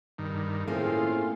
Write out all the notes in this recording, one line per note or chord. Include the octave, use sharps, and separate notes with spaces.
G2 D#3
A2 A3 A#3 C4 C#4 F4 G#4